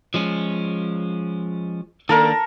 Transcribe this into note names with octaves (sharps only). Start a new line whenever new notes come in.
F3 G#3 C#4
D#3 A#3 D4 A4 A#4 A#5